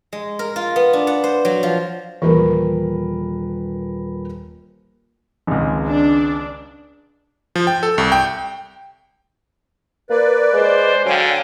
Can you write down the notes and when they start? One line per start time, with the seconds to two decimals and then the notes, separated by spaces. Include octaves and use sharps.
0.13 G#3
0.39 A#4
0.56 F4
0.76 B3
0.93 D4
1.07 F#5
1.24 C5
1.45 F#3
1.63 F3
2.22 D#1 E3 A#4 B4
5.47 G#1 C#2
5.87 D4
7.55 F3
7.67 G5
7.83 A4
7.98 C2
8.12 G5
10.10 A#3 B4 D5
10.54 G#3 C5
11.06 D3 F#3 F5 G5 G#5